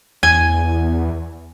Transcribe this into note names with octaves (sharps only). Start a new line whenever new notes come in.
E2 G#5